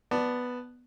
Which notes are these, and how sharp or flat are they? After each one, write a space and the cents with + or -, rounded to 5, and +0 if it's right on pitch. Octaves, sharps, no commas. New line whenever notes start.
B3 +0 D5 +10 A5 +0